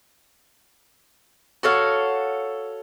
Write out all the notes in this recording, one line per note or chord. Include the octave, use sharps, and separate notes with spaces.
F#4 A4 C#5 F5